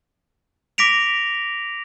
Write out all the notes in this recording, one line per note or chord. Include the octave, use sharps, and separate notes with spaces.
D6 A#6 B6 D7 F7